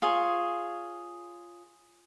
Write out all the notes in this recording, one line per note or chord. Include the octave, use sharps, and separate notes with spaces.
F4 G#4 C#5